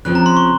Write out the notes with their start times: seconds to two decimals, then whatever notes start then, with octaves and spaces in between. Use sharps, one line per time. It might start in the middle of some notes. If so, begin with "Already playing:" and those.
0.05 C#3 F3 C4 F#6
0.15 A#5
0.26 C6
0.37 C#6